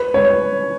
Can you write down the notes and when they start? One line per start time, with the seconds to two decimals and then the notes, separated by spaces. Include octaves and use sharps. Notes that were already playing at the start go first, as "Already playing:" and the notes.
Already playing: B4
0.14 C#5